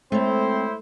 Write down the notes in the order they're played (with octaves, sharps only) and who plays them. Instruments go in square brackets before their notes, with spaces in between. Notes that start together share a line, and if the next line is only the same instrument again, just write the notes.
[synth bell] G#3 C#5 [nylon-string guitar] A3 [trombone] C4 [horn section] E4 C5